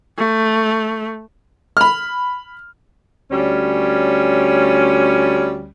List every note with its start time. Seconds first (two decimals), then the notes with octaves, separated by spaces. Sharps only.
0.18 A3
1.77 B5 F6
3.31 D2 G3 C#4